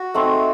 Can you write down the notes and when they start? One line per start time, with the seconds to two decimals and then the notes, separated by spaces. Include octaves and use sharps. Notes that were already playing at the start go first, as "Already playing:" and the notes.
Already playing: F#4
0.14 A3 C4 D#4 G#4